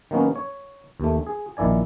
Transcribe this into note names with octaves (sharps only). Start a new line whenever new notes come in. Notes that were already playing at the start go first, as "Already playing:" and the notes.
D#3 F#3 A#3 B3 C#4
C#5
D#2 A3
G#4
A#1 D#3 E4 D5 G#5